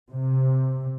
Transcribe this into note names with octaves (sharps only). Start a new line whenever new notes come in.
C3